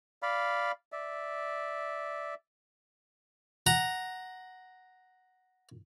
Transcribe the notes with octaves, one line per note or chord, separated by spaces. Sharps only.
D5 F5 B5
D5 E5
F#5 A#5